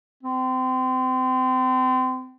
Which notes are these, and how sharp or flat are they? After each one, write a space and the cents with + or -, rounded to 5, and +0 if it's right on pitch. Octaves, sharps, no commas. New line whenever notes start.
C4 -30